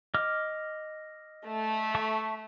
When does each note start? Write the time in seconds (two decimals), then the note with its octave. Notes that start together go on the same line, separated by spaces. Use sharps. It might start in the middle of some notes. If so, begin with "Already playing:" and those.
0.14 D#5 D6 F6
1.46 A3
1.95 E5 A5 C#6